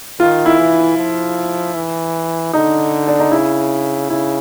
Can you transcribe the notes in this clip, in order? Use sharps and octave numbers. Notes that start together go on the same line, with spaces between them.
D#3 F4
E4
E3
F3
E3
D3 D#4
D4
D#4
C#3 E4
C#3 E4